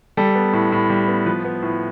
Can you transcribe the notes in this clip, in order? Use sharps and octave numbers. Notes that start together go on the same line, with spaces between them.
G3 A4
B3
A2
A2
G3
B3
F3 B4
B3
A2